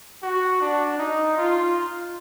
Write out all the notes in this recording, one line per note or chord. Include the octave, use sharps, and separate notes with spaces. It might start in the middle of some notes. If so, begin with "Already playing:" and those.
F#4
D4
D#4
F4